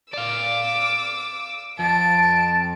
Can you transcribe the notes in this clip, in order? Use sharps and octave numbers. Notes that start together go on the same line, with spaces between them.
D5 F5 D6 E6
F2 A5 D7